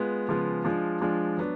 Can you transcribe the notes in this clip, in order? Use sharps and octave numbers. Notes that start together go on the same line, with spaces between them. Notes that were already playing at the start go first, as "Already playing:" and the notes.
Already playing: G#3 B3 F4
C#3 F3 G#3 B3 F4
F3 G#3 D4 F4
F3 G#3 D4 F4
F#3 B3 D4